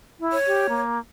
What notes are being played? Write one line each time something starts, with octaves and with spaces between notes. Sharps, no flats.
E4
C#5
G4
A#3